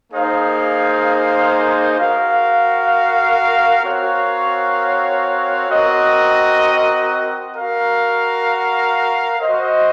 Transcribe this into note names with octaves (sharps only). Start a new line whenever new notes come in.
A#3 D#4 G#4 C5 F5
F#4 A#4 F5
C4 F#4 A#4 C#5 F5
C4 F#4 A#4 D#5
F#4 A#4 F5
F#4 C5 D#5